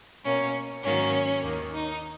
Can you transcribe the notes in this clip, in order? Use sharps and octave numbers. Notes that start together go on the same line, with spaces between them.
B2 A#3 C#4
G#2 D#3 F#3 A#3 C#4
D#2 D#3 A#3
D#4